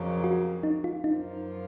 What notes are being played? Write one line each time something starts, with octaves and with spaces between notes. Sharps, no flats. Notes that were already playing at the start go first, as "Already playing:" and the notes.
Already playing: F2 C#3 F#3 A#3
F#4
D#4
F4
F#2 F3 A#3 D#4